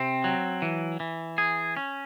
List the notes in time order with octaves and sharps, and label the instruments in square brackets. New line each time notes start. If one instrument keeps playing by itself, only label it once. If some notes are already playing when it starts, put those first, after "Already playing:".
Already playing: [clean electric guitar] C3 C4
F#3
E3
E3
G#4
C#4